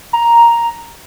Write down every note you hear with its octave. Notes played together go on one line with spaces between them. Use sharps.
A#5